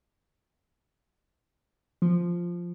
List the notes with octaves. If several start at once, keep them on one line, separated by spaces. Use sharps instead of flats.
F3